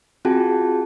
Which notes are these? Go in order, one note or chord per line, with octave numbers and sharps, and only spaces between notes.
C4 F4 F#4 G#4 G5 A5